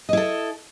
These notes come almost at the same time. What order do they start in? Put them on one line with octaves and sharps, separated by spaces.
D#5 E4 A4